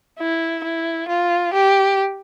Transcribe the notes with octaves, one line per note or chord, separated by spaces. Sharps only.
E4
E4
F4
G4